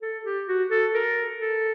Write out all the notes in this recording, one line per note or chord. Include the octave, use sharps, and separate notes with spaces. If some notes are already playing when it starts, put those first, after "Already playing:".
A4
G4
F#4
A4
A#4
A4